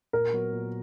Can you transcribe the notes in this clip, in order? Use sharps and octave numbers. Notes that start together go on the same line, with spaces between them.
A#2 A#4
F#3 B3 F#4
A#2